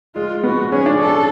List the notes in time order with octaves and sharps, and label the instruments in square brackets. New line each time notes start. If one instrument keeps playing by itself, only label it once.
[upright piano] G#3 [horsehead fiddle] F4
[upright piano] B3 [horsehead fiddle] F#4
[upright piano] C#4 [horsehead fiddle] G#4
[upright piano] D4
[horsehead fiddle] A4